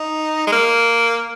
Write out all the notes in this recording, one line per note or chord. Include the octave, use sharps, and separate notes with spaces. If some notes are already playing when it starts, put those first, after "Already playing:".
Already playing: D#4
G#3
A#3